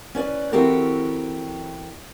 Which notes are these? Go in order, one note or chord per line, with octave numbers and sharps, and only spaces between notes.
C#4 B4 D5
E3 C4 F#4 G4 A4 A#4